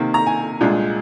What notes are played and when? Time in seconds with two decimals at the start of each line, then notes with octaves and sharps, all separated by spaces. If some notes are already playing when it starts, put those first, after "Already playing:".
Already playing: C3 D#3 A#3
0.14 A#5
0.26 G#5
0.61 C2 A#2 G#3 D4